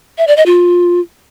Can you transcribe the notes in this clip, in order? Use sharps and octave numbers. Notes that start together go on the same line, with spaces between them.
E5
D5
D#5
F4